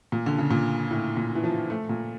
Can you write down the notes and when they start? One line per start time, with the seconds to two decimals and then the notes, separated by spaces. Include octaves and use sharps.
0.12 A#2
0.26 D3
0.38 C#3
0.51 A#2
0.91 A2
1.17 A#2
1.35 E3
1.44 F3
1.70 A3
1.89 A#2